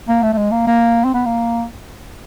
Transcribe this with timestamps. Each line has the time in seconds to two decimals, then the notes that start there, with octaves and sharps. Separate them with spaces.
0.09 A#3
0.23 A3
0.33 A3
0.37 G#3
0.52 A#3
0.67 A#3
1.05 C4
1.14 B3
1.25 A#3